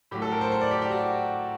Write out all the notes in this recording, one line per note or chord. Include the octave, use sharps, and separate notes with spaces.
A2 F#3 A3 G4
A4
A#4
C5
C5
D5
G4
G4
F#4